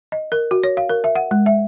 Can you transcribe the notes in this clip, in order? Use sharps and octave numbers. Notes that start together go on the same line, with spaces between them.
D#5
A#4
F#4
C#5
F5
A#4
E5
F#5
G#3
E5